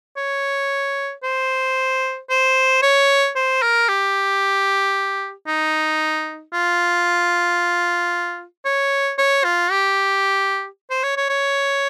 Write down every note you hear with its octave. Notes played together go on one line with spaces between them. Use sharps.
C#5
C5
C5
C#5
C5
A#4
G4
D#4
F4
C#5
C#5
F4
G4
C5
C#5
C#5
C#5